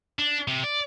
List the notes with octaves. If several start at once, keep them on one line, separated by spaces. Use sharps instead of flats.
D4
C3
D5